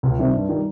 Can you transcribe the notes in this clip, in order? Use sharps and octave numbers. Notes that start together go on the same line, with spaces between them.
C#2
C3 D#3 G3 C4
G2
D#3 G3